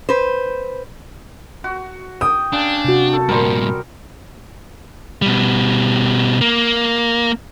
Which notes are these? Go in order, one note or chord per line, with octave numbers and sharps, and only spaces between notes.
B4 C5
F#4
G5 D#6
C#3 D4
C3 F#4
A4
G2 A#2 G3 C4 A#4
B2 G3
A#3